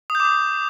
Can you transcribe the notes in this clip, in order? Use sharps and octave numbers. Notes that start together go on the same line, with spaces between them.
D#6
G6
D6
D#6